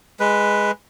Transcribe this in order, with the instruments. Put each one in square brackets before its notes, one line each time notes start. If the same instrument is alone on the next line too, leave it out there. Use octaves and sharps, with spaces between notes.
[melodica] G#3 B4